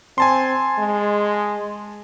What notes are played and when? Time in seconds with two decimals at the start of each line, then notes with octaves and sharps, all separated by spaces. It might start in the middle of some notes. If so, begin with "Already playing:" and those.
0.18 C4 G#5 A5 C6
0.79 G#3